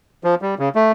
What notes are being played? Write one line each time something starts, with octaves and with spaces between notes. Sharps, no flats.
F3
G3
C#3
A3